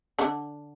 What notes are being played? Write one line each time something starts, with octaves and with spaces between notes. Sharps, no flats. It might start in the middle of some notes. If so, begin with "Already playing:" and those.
D3 D4